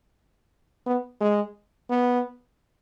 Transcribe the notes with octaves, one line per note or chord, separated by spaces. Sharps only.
B3
G#3
B3